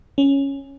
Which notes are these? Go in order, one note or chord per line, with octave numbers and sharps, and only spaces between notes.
C#4